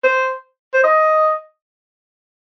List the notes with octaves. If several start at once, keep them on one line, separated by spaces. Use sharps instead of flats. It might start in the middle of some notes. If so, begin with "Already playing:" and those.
C5
C5
D#5